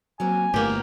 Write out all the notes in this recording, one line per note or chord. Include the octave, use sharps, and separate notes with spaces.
F#3 A#3 C4 G#5
G1 A2 A#3 B3 G4